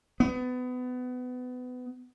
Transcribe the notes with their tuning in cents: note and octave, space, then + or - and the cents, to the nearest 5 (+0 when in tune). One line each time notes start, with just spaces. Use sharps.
B3 +25